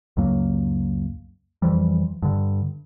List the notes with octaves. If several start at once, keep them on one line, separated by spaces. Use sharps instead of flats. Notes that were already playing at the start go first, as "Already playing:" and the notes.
C#2 F#2 F#3 A#3
F2 E3 F3 G3
G2 D3